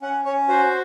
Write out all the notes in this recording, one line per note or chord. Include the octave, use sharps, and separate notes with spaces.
C#4 F#5
C#4 C#5
F#4 C5